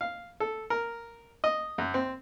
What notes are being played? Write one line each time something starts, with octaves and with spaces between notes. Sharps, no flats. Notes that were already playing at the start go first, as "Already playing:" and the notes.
F5
A4
A#4
D#5
F#2
C4